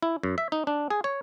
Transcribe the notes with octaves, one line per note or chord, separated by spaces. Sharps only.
E4
F#2
E5
D#4
D4
G#4
C#5